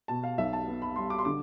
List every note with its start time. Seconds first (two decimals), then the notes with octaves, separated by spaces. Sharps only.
0.08 B2 A5
0.23 F5
0.38 B1 E5
0.53 A5
0.67 B3
0.82 B5
0.96 G3 C6
1.10 D6
1.19 C6
1.25 D3 D6